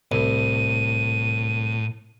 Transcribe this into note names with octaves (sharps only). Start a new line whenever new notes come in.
C2 A2 D#7